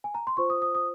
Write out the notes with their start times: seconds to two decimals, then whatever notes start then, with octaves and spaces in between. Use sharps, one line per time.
0.04 G#5
0.14 A#5
0.27 C6
0.37 F4 C5 C#6
0.50 D#6
0.62 D#6
0.75 D#6